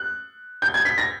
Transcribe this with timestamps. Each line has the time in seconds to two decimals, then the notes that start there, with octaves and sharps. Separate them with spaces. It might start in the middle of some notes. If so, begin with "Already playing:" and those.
Already playing: F#6
0.62 G6
0.74 G#6
0.85 B6
0.98 A#6